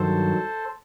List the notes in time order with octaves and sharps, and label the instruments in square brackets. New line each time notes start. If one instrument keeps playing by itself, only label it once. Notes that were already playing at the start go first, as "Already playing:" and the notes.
Already playing: [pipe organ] G2 D#3 F#3 A4 C5